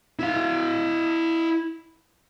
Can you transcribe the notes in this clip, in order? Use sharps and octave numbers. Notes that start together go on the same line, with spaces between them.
E4 F5